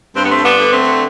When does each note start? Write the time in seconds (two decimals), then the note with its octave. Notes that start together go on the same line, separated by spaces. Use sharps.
0.15 G2 C4
0.24 B3
0.31 A3 C4
0.38 G2
0.44 B3 D4
0.59 D3
0.73 A3 C4
0.81 D3